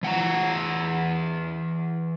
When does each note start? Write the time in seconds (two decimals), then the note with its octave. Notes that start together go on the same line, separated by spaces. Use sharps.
0.03 E3 F#5 G#5 A#5